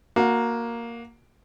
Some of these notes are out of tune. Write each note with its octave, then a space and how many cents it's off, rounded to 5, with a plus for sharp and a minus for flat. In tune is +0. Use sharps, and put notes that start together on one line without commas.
A#3 +0 F#4 -15